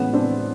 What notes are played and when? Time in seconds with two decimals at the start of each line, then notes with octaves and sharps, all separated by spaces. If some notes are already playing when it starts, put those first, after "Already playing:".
Already playing: A2 E3 G#3 B3 C#4
0.13 C4 D4